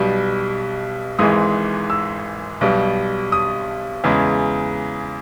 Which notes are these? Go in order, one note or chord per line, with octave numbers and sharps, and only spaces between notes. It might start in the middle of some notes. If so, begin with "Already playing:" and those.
Already playing: B1 B2 G3
G#1 G#2 E3 G#3 D#6
E6
B1 B2 G3
D#6
E2 C#3 G#3